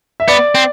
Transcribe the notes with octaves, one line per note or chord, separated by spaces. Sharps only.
E5
B3 D5
C4